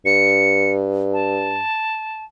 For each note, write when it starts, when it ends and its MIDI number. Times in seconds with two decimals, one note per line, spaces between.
0.06 1.63 43
0.06 0.71 97
1.13 2.24 81